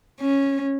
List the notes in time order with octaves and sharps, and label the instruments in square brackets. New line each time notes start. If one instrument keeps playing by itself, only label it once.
[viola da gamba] C#4